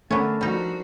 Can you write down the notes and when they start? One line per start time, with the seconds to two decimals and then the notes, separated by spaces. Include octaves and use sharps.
0.11 D3 A3 B3 C#4 D4 A4 A#4
0.41 F3 G3 D#4 F#4